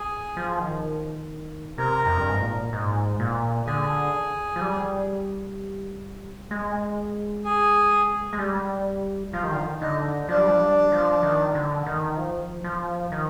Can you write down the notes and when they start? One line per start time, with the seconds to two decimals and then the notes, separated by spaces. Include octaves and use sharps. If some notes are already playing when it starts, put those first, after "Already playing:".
Already playing: G#4
0.37 F3
0.59 D#3
1.78 C3 A#4
2.06 F2
2.17 G2
2.29 G#2
2.41 A#2
2.73 G#2
3.20 A#2
3.66 D3 G#4
4.56 F3
4.61 G3
6.51 G#3
7.44 G#4
8.33 G#3
8.39 G3
9.33 F3 F4
9.42 D#3 G4
9.52 D3 F4
9.60 D#3
9.81 D3 D#4
10.28 F3 D4
10.37 G3
10.47 F3
10.60 G3
10.92 F3
11.23 D#3
11.55 D3
11.86 D#3
12.17 F3
12.64 F3
13.12 D#3